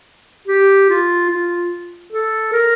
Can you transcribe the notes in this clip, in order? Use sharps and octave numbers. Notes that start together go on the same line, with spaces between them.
G4
F4
F4
A4
A#4